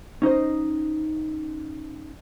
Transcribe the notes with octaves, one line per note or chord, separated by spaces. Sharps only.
C#4 D#4 C5 D#5